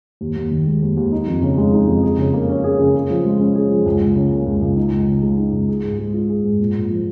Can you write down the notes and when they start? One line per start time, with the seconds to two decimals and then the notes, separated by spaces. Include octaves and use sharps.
0.21 D#2
0.36 D#2
0.51 D#3
0.66 G#3
0.82 D#2
0.97 D#2
1.12 D#4
1.27 F2
1.42 C#3
1.58 G#3
1.73 D#4
1.88 F2
2.03 G#4
2.18 C#3
2.34 A#3
2.49 C#4
2.64 G#4
2.79 C#3
2.95 G#4
3.10 F3
3.25 G#3
3.40 C#4
3.55 G#4
3.71 F3
3.86 C#2
4.01 C#2
4.16 C#3
4.31 A#3
4.46 C#2
4.62 C#2
4.76 D#4
4.92 C#2
5.08 C#3
5.23 G#3
5.38 D#4
5.53 C#2
5.69 G#4
5.84 G#2
5.99 G#3
6.14 F4
6.29 G#4
6.44 G#2
6.60 A#2
6.75 A#2
6.90 F3